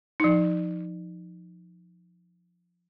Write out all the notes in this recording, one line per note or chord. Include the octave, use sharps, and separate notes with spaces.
F3 D#4